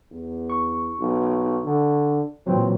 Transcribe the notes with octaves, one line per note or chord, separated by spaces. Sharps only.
E2
C#6
B1
D3
A#2 E3 F#3 C4